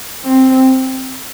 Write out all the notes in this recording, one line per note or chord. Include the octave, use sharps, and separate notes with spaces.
C4